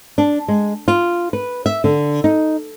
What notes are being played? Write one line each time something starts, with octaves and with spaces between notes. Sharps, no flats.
D4
G#3
F4
B4
E5
D3
D#4